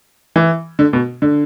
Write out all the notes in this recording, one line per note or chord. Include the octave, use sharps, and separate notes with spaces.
E3
D3
B2
D3